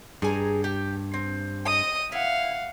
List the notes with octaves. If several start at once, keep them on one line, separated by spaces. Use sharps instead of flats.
G2 G#4 G#5 A#5
G4
C4
D#5 D#6
E4 F5 F#5